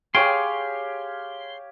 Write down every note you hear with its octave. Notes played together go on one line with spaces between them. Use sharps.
G4 G#4 C#5 F5 G5 C6